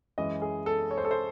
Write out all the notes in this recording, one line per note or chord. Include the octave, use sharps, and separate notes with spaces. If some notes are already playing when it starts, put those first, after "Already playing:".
F#2 E3 G#3 D#5
G#4
A4
C#5
C5
A4
C5